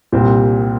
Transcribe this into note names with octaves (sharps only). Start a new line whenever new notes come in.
C2 A#2 G3 C4